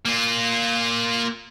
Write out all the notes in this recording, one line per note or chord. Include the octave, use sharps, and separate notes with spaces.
A#3 F4